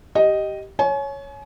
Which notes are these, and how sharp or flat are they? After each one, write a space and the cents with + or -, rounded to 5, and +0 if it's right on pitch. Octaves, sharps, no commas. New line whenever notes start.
G4 -10 D#5 +0
C#5 +0 G#5 +35